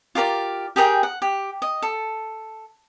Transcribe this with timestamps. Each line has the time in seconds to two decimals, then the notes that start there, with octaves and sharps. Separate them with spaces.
0.15 F4 G4 A#4 D5
0.76 G4 G#4 A#4 G5
1.03 F#5
1.22 G4
1.62 D#5
1.82 A4